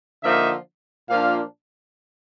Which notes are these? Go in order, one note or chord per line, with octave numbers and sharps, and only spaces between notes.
D3 F3 A#3 D#4 E5
A#2 F3 A#3 D4 F5